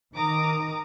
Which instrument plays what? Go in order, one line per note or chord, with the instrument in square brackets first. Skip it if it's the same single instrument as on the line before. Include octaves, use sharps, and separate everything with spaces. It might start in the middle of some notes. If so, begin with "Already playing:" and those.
[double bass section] D#3 [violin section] A#5 D6 D#6